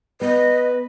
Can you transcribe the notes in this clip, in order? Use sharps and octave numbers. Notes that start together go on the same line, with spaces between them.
B3 B4 D#5